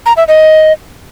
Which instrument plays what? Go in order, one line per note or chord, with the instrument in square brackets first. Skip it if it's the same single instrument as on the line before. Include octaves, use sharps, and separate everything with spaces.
[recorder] A#5
E5
D#5